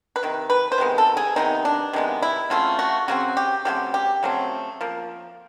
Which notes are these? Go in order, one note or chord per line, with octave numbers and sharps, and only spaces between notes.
B4
C3 D#3
B4
C5
C3 D#3 G#3 B3
A4
G#4
C3 D#3 G#3 B3 D#4
D4
C3 D#3 G#3 B3
E4
C#3 F#3 A3 C4 F4
F#4
C#3 F#3 A3 C4 F#4
G4
C#3 F#3 A3 C4 G4
G4
C#3 F#3 A3 C4
F3 A#3